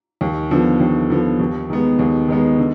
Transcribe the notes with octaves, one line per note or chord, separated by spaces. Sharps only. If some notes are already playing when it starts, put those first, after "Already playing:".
D#2
D3 F3 B3
D#2
D3 F3 B3
D#2
D#3 G#3 B3
D#2
D#3 G#3 B3
D3